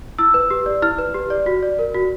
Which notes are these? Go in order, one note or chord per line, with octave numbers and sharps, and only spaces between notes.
E4 E6
B4
G4
D5
E4 F6
B4
G4
D5
F#4
D5
A#4
F#4